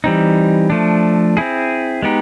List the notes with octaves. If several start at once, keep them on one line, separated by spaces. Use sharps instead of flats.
E3 G3 C4 D#4
F3 A3 D4
C4 E4 G#4
G#3 B3 D#4 G4